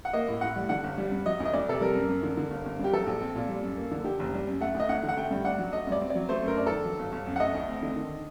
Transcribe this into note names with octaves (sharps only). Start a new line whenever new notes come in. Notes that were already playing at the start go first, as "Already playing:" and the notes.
F#5
A#3 D#5
A2
A2 F#5
G3
D3 F#5
G1
G3
G2
F#3 D#5
D2
D#5
D2 D5
C3 A4
G3 A#4
F#2
F#2
D3
D3
G1
G1
G2
G4
F#3 A4
A#1
C4
A#2
G3
F#2
A#3
D3
D3 G4
F#1
G3
F#2
A3 F#5
D2
D#5
D2 F#5
D3
F#5
A3 G5
G2
D4 F#5
F#3
A3 D#5
G2
D5
C4
D5
F#3
A3 C5
F#2
A#4
D4
D#3 A4
F#3
G1
G1
F#2
F#5
A3 D#5
D2
C4
D3
D#3